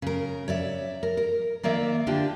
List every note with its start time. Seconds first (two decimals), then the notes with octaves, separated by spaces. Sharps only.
0.02 C#3 A#4
0.48 C#5 D5 E5
1.03 A#4
1.17 A#4
1.63 D#3 A#3 D5 E5
2.07 D3 D4 F4 G4